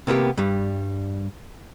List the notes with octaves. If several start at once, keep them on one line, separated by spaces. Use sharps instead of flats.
C3 A#3 B3 G4
G2 G3